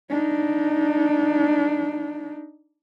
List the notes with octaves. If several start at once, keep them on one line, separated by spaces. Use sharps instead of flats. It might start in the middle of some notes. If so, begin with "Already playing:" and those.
D4 D#4